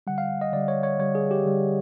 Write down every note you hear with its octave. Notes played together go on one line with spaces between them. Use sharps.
D3 G3 F#5
F5
D#5
D3 G3 D5
C#5
C#5
D3 G3 C#5
G#4
G4
D3 G3